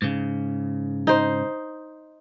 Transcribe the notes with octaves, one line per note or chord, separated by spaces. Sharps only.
G#2 C#3
D#4 C5